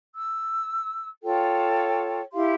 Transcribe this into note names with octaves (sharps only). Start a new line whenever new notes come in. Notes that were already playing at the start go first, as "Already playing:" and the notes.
E6
F4 A4 C#5 G5
E4 G4 F5 C6